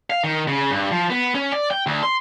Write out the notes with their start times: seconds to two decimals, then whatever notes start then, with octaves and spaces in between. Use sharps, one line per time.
0.10 F5
0.24 D#3
0.48 C#3
0.71 G2
0.91 F3
1.10 B3
1.35 C#4
1.52 D5
1.71 G5
1.86 D2
2.03 C6